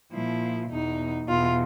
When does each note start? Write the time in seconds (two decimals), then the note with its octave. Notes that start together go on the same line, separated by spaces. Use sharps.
0.12 A#2 F3 E4
0.69 E2 B2 D#4
1.27 E2 B2 F4